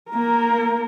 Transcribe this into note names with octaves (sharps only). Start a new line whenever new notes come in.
A#3 A#4